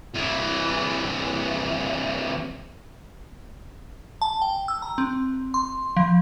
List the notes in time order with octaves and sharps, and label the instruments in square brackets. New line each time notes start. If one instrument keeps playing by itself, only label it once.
[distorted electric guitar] C2 E3
[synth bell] A5
G5
E6
A#5
C4
C6
F3